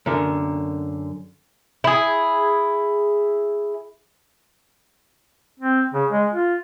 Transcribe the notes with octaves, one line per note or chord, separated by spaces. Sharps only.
F#2 D3 A#4
E4 G#4
C4
C#3
G#3
F4